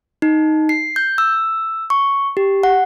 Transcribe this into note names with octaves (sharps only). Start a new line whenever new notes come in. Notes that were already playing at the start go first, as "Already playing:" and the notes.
D#4
C7
G6
E6
C#6
G4
F#5